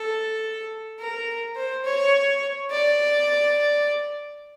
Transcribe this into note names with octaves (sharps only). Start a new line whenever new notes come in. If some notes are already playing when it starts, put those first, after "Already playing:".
Already playing: A4
A#4
C5
C#5
D5